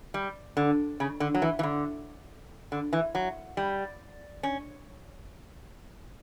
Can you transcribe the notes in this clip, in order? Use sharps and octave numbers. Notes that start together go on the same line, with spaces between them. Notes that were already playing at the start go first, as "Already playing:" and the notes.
G3
D3
C#3
D3
F#3
E3
E3
D3
D3
E3
F#3
G3
C#4